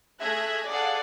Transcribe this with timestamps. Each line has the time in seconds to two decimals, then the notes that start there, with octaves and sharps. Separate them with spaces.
0.21 A3 G#4 E5 F#6 G#6 A#6
0.69 G#4 A4 D5 F5 F#5